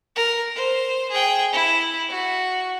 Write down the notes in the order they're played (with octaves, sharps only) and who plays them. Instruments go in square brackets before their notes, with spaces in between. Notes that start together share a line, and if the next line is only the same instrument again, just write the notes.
[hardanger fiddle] A#4
C5
G#4 G5
E4
F#4